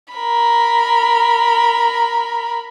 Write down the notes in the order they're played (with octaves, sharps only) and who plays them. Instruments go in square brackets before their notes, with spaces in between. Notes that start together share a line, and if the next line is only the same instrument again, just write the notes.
[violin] A#4 B5